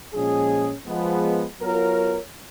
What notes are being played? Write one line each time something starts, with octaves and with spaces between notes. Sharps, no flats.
A#2 F3 G#3 C#4 G#4
F3 G#3 B3
F#3 B3 F4 A#4 C#5